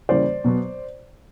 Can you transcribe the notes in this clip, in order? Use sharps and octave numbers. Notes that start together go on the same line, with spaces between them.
C#3 E3 G3 A#3 C5 D5
B2 F#3 B3